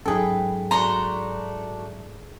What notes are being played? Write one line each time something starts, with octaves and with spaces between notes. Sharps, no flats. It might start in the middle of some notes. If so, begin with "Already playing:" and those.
G#2 F#3 C#4 D#4 G#4 A4 B4 G5
A3 D4 F#4 A#5 C6